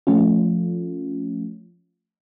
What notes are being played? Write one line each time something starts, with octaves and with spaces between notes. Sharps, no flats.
F3 A3 C#4 F4